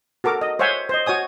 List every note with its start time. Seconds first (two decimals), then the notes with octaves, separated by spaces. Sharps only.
0.24 F#4 A4 A#4 D6
0.41 D#5
0.59 C5 C#5 E5 F#5 G#5
0.89 C5 D#5
1.06 F#4 C#5 G#5 D#6